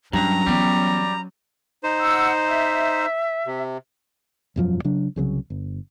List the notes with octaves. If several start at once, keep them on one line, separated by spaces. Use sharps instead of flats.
G2 F#3 G3 C#4 A#5
E3 G3 B3
D#4 C5
F#5 E6
E5
C3
E1 F#2 F3 F#3
C#3 F#3 D4
C2 C#3 F3 F#3
G1